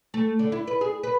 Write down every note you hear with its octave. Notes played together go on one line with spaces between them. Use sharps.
A3
D3
E4
B4
G#4
B4